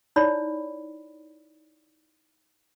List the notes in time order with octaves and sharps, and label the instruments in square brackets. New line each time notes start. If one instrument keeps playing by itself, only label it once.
[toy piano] D#4 E4 C#5 D5 B5